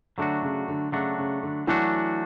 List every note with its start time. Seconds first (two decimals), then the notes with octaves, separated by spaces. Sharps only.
0.18 D3 F#3 A3 D4 F#4
0.42 C#3
0.68 D3
0.92 C#3 F#3 A3 D4 F#4
1.18 C#3
1.43 D3
1.67 E3 F#3 A3 D4 F#4